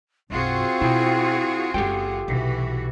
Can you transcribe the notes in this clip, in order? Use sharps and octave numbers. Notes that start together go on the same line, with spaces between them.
B1 F#2 C4 F4 F#4 G#4
B2 E4 G5
F#1 G#3 G4 A4 G5
B1 C3 E3 F#4